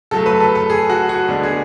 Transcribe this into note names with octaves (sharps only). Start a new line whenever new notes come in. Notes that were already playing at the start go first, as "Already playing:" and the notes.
C#3 F#3 A3 A4
B4
A4
A4
G#4
F#4
F#4
D2 D3 G#3 B3 D4
G#4